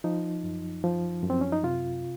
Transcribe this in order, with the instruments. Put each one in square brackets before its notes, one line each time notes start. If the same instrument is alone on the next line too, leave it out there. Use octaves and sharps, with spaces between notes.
[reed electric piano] F3 D#4
F#2
F3
F#2
C4
C#4
D#4
C3 F4